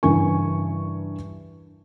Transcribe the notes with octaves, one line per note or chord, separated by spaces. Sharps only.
G2 C#3 E3 A#4 G#5 C#6